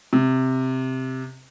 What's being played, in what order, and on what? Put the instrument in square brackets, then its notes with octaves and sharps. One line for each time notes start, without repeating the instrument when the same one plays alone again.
[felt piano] C3